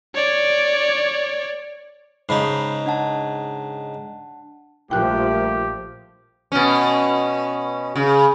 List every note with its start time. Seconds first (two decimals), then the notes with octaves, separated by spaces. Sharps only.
0.15 C#5 D5
2.29 G#2 C#3 D#4 A5 B5 C7
2.86 D4 F#5 A5
4.91 A#1 F3 G3 A3 G4 A#4 G5 F#6
6.52 B2 C#4
7.96 C#3